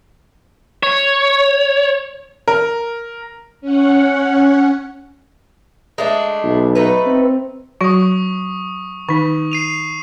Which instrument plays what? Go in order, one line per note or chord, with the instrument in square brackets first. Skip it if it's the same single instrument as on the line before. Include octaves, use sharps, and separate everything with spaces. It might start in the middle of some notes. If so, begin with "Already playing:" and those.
[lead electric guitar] C#5
[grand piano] A#4
[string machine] C#4 F#5
[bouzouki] G#3 A3 D4
[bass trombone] B1
[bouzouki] A3 D#4 B4
[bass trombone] C4
[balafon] F#3 F#4 [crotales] C#6 D#6
[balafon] D#3 D#4 [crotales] C#6
[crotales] C7 D#7 F7